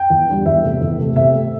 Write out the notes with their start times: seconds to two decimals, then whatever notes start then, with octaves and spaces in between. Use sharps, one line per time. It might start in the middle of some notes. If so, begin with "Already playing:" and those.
Already playing: G5
0.10 E2
0.28 D3 G3
0.46 E2 E5
0.63 C3 A3
0.81 E2
0.98 C3 A3
1.16 C3 E5
1.33 A3